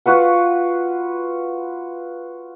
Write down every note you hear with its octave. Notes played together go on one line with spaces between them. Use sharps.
F4 F#4 B4 F#5